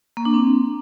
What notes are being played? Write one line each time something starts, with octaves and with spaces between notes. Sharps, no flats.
A#3
D4
C4